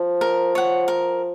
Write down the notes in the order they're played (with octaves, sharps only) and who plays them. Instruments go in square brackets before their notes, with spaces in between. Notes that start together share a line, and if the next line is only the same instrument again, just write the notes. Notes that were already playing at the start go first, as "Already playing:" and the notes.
Already playing: [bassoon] F3
[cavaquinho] A#4
C#5 F#5
A#4